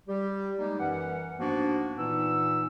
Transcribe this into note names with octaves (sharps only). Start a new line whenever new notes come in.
G3 G4
G3 G#3 A#3 D#4
F#2 E3 C#4 F#5
G#2 F3 A#3 B3 D4 F#4
A#2 E3 B3 D#4 E6